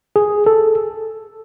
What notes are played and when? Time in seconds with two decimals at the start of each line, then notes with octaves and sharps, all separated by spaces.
0.16 G#4
0.46 A4